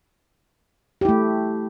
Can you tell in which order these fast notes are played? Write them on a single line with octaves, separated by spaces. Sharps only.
G4 E4 A3